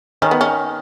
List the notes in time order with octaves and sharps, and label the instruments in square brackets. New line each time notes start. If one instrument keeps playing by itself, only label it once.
[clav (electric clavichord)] D#3 [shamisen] C#4
[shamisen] B3
C#4